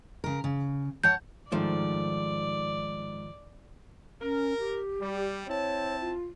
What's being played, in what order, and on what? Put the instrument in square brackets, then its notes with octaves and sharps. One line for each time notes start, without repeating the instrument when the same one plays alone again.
[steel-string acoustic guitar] C#3 A#4
C#3
[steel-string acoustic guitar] C#5 F#5 A5 [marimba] G6
[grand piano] G#2 [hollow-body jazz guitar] D#3 F3 A3 [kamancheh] D5
[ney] C#4 [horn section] A#4
[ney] G4
[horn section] G3
[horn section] C4 E4 A5 [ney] C#5
[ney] F4